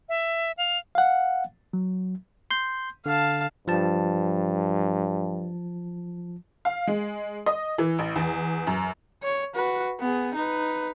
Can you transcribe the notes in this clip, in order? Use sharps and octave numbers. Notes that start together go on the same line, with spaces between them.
E5
F5
F5 F#5
F#3
C6 G6
D3 F5 A5
G2 F3 A5
F5
G#3
D#5
E3
A1
E2
F#2
C#5
F#4 B4
B3 G#4
D#4 B4